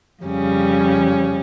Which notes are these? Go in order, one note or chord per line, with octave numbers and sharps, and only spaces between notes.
F2 C#3 G3 C#4